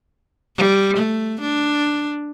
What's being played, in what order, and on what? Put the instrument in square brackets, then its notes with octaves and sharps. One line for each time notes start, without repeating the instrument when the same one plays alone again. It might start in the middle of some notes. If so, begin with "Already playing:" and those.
[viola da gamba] G3
A3
D4